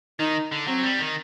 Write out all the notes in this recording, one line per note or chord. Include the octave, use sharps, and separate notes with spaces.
D#3 D#4
D3
F#3 C4
G3
D#3